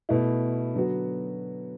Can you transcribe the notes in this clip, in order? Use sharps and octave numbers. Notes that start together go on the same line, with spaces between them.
B2 A3 E4
D3 F#3 B3 F#4